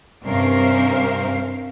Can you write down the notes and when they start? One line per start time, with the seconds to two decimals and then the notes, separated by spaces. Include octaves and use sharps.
0.24 G2 C3 C#4 A#4 C5 F5